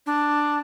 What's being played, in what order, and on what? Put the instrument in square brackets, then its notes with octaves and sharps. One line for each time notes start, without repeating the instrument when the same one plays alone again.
[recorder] D4